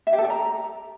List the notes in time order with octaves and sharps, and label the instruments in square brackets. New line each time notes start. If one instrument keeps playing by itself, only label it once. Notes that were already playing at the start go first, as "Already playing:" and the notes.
[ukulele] E5
G4
A4
D5
A#5